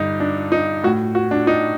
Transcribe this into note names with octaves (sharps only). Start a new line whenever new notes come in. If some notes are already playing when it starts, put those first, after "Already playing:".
Already playing: G2 D3 D#4
D4
D#4
A2 F#4
F#4
D4
D#4